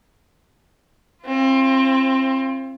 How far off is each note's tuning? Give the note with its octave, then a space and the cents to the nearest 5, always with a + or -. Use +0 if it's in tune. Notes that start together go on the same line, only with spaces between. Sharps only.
C4 +25 F4 -30